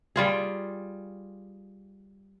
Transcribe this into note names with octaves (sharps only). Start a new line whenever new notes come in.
G3 F4 G#4